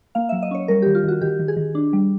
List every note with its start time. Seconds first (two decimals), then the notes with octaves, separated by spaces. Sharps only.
0.15 A#3 F5
0.29 E5
0.32 F#3
0.42 D#5
0.51 C#4 C#5
0.68 G3 A#4
0.82 G4
0.86 D#3
0.95 F4
1.04 D#3 F#4
1.21 D#3 G4
1.39 D#3
1.48 G#4
1.57 D#3
1.75 D4
1.93 G3